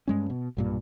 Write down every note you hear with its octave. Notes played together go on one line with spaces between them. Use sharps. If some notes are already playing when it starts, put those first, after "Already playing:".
G2 G#3 C#4
B2
B1 G2 A#2